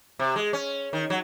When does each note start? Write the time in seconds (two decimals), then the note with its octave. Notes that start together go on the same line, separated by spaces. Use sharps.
0.19 C3
0.36 G#3
0.53 C#4
0.93 D#3
1.10 F#3